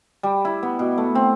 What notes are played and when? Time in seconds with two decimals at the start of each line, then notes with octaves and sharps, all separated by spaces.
0.23 G3
0.45 E4
0.63 B3
0.79 B2
0.98 A3
1.15 C4